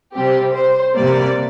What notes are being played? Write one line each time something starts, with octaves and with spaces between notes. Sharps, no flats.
C3 G3 C4 G4
C5
C3 G3 A#3 D5